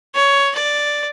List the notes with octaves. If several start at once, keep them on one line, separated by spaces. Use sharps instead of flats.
C#5
D5